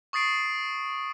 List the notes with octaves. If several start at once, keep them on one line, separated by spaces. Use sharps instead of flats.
C#6 D#6 A6 C7 D7